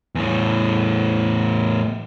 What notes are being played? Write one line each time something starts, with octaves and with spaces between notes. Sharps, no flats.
E2 A2